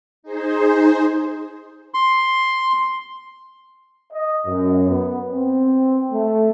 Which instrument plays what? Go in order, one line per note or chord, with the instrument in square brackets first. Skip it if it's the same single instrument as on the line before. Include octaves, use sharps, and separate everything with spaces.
[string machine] D#4 G#4 C5
[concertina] C6
[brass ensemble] D#5
F#2
B3
C4
A3